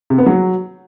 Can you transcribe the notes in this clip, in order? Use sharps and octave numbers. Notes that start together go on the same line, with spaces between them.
C3
B3
F#3